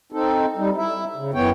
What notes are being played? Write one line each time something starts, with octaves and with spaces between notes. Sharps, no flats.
C4 D#4 A4
G3 D#4
E4 E5
C#3
F#2 E3 B3 C#5 G5